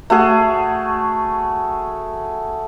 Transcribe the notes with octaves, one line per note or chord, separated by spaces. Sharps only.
A3 F#4 G#4